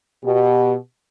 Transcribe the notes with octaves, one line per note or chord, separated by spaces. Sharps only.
B2 G4